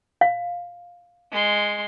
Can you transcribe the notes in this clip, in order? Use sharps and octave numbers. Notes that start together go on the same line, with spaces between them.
F5
G#3 C6